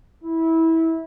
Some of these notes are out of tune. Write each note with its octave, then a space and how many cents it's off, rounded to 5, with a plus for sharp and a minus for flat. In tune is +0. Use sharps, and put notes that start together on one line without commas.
E4 -20